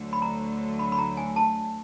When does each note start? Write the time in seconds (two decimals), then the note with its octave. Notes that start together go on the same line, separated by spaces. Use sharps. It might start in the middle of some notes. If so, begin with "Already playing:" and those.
Already playing: D2 D3 F#3 A3
0.13 B5
0.22 A#5
0.79 B5
0.92 B5
0.99 A#5
1.17 G#5
1.36 A5